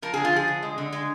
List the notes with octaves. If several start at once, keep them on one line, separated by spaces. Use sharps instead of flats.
F3 A#4
D3 G#4
F4
F3 G#4
D3
G#3
D3
G#3